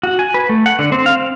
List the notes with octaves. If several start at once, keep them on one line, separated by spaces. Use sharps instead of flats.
F#4
G#5
B4
A3
F#5
D3
C4
F5
C4